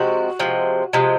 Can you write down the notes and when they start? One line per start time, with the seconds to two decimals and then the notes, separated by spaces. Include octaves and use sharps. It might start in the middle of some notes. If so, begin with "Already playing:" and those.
Already playing: C3 F3 G#3 F#4
0.39 C3 F3 G#3
0.93 C3 F3 G#3